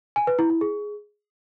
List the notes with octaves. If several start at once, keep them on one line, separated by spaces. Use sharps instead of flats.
G#5
B4
E4
E4
G#4